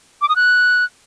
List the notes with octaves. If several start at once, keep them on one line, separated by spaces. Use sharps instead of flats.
D6
D#6
F#6